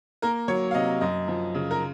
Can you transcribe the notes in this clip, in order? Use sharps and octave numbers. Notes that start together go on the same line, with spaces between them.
A#3 A#4
F#3 C#5
F5
C3 D#5
F#2 D#5
F3
C#3
A#4